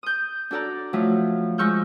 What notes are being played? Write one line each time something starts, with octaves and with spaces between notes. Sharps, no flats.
D#6 G6
D4 F#4 A4 D5 A#5 F#6
F3 F#3 A3
F3 G#3 C#6 E6 F6 G6